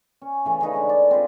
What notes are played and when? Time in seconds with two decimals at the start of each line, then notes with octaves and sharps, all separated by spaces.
0.21 C#4
0.45 C#3 E3 A3
0.61 C#3 A3 D#4 B4
0.73 D3 G#3
0.89 D5
1.11 C4 F4 B4